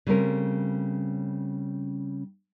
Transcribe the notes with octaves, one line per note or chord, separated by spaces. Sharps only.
C#3 G3 A3 C4 C#4 A#4